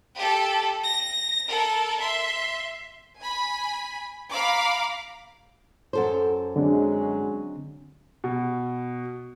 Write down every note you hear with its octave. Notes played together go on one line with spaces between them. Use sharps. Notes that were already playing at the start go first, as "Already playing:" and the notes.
G4 A4
A#6
A4 A#4
E5 C6
G#5 B5
F5 A#5 B5 D6
F#2 A4 C5
D3 F#3 G#3 C4 D4
B2